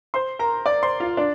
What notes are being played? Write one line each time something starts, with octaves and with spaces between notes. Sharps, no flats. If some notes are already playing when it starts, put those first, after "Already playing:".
C5 C6
A#4 A#5
D5 D6
C5 C6
F4 F5
D4 D5